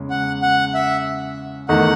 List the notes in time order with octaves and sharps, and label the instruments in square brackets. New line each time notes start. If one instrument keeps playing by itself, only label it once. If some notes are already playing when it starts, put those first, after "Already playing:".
Already playing: [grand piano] E2 C#3 G#3
[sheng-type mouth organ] F#5
F#5
E5
[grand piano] E2 D#3 A3 D#4 [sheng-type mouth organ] F#5